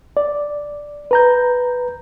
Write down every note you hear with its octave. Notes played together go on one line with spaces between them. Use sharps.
D5
B4 A#5 G6